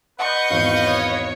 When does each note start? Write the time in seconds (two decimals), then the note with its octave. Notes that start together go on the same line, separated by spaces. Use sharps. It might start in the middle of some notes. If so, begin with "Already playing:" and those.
0.19 B4 D#5 F#5 C#6 G6
0.50 G#1 E2 F5
0.86 C#5